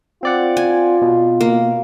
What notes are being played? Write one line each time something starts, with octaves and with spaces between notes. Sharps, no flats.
C4 F4 D5 F#5
G#5
B2
A#3